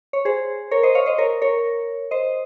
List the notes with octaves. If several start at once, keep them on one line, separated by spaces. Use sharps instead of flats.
C#5
G#4 C5
A#4 C#5
C5 D#5
C#5 F5
C5 D#5
A#4 C#5
A#4 C#5
C5 D#5